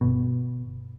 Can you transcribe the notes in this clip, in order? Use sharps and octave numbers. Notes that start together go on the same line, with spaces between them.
G1 B2